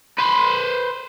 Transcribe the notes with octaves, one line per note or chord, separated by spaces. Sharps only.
B4 C5